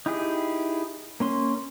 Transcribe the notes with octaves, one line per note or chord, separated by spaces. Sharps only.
D#4 E4 G4 G#4
A#3 C#4 C6